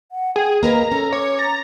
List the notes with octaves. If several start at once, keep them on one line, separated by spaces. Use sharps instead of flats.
F#5
G#4 G5
A#3 A#4 B4 D#5 A#5
C#4 A4
C#5 D6
A#5 A6